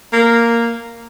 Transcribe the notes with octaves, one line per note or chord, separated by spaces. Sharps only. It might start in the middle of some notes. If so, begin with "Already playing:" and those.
A#3